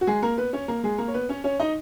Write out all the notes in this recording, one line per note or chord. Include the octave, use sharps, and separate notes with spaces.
F#4
G#3 G#4
A#3 A#4
B3 B4
C#4 C#5
A#3 A#4
G#3 G#4
A#3 A#4
C#5
B3 B4
C#4 C#5
C#4 C#5
D#4 D#5